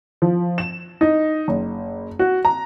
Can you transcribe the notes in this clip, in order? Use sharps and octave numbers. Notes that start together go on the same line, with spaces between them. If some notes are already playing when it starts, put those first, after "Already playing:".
F3
E7
D#4
F#1
F#4
A#5